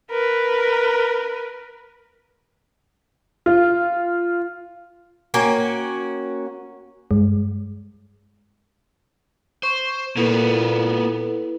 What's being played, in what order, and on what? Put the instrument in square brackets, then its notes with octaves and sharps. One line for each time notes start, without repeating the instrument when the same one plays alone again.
[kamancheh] A#4 B4
[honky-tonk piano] F4
[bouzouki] A#3 C#4 F#4 G5
[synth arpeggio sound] G2 G#3
[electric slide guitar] C5 [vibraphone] C#6
[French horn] A#2 [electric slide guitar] A#3 B3 [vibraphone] E4 A4 B4